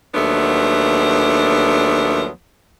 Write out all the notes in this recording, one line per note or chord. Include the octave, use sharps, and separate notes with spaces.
D#2 F3 F#3 A3 B3 D4